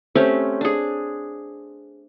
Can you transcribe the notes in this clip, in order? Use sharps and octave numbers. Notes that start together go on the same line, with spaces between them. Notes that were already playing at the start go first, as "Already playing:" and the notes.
A3 C4 C#4 G4
D4 G#4